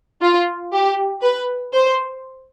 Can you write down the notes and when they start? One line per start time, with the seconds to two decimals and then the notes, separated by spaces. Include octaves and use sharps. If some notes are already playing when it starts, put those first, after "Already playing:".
0.22 F4
0.73 G4
1.22 B4
1.73 C5